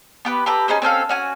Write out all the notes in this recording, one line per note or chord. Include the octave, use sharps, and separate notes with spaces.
B3 G4 B4
G4 A4 B4 A#5
C#4 D#4 G#4 C5
C4 C#4 A4 F5
C#4 F#4 G#5